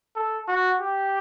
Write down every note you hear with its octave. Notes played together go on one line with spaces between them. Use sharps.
A4
F#4
G4